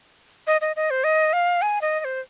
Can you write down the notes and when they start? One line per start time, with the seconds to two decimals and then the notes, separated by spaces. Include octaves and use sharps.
0.47 D#5
0.61 D#5
0.76 D#5
0.91 C5
1.04 D#5
1.33 F5
1.62 G#5
1.81 D#5
2.00 D#5
2.05 C5